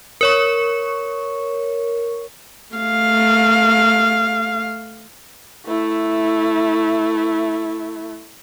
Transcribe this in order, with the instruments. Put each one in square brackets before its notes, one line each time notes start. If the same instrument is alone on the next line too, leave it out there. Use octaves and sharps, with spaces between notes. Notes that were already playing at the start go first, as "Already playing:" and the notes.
[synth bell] A#4 C#5 C#6
[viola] A3 F5
[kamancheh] A3 E4